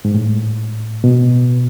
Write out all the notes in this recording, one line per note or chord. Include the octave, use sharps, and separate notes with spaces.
G#2
A2
B2